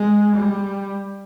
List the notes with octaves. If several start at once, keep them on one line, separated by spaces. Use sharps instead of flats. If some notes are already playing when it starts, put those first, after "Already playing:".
Already playing: G#3
G3